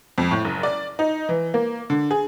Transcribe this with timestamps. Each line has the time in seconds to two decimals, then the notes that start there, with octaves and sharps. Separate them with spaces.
0.18 F2
0.31 A2
0.45 F#1
0.63 D5
0.99 D#4
1.29 E3
1.54 A#3
1.90 D3
2.11 G#4